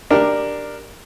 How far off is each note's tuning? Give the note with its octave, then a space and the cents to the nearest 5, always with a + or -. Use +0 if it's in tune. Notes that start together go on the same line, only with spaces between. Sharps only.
D4 +10 G4 +0 A#4 +0